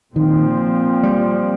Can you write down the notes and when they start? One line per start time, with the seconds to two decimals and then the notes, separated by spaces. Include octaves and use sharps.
0.15 A#2 D#3 F3 C4
1.03 G3